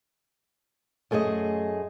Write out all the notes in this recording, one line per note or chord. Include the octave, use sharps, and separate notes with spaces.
F#2 A3 G#4 C5 D#5